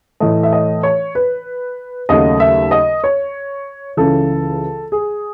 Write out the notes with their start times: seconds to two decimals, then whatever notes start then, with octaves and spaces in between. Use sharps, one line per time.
0.20 A2 E3 A3 D#5
0.43 E5
0.52 D#5
0.83 C#5
1.15 B4
2.09 D#2 C#3 F#3 A3 D#5
2.40 E5
2.71 D#5
3.04 C#5
3.97 C#2 C#3 E3 A4
4.92 G#4